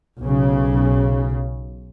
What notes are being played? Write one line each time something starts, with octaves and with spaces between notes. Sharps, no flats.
B1 C#3